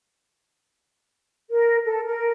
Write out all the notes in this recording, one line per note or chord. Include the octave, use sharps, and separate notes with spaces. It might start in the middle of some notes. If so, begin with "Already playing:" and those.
A#4
A4
A#4